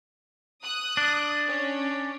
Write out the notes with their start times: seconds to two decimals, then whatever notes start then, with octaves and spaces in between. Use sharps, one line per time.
0.64 D#6 F#6
0.97 D4
1.48 C#4